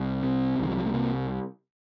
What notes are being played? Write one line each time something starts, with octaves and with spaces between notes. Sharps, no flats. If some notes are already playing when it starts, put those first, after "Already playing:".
Already playing: C2
C3
C2 D#3
F3
F#3
A3
C3 A#3